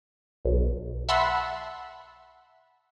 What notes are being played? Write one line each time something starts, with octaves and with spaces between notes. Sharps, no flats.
B1
E5 F#5 A5 B5 C6 E6